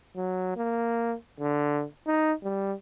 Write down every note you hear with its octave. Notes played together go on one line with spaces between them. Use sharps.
F#3
A#3
D3
D#4
G3